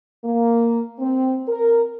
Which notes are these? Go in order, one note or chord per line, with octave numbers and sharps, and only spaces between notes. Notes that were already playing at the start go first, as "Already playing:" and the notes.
A#3
C4
A#4